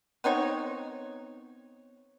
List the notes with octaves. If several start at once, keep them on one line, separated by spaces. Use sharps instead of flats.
B3 C4 D#4 C#5